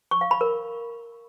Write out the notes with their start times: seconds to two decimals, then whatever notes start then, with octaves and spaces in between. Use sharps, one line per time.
0.11 C#6
0.21 F5
0.31 B5
0.41 A#4